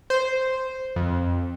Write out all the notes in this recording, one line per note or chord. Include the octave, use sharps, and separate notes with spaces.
C5
F2